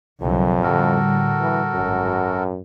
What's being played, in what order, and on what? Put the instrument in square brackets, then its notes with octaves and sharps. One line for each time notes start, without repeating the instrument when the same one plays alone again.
[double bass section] C2 D3 F#3 [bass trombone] F2
[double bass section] A2 D3 G3 [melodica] F#4 A4 A#4
[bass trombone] E3
[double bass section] G#1 [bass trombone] F#2